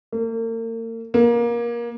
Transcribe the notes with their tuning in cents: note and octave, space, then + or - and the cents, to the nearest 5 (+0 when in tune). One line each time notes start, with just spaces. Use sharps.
A#3 -40
A#3 +25